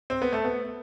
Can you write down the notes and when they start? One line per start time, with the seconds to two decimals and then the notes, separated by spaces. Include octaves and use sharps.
0.10 C4
0.22 B3
0.33 A3
0.44 B3